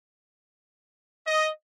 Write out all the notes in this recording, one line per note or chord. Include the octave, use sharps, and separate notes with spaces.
D#5